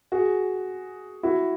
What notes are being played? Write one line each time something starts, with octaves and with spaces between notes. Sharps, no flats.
F#4 G#4
E4 F#4